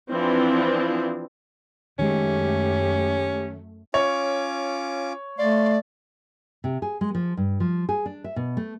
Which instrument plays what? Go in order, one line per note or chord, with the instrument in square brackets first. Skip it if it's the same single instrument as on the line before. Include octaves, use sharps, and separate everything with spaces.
[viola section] E3 F3 C4 D4
[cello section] F#2 A3 [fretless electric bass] D#3 G#3 [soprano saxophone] C#4 [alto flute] G4
[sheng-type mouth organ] C#4 F4 D6 [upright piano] C#5
[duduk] A3 [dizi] D5 [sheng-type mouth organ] F5 C6
[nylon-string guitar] C3
G#4
G#3
F3
G2
F3
G#4
D4
E5
B2
A3